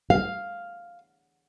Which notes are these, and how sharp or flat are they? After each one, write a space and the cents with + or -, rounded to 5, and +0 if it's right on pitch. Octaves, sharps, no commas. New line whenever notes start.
F5 +0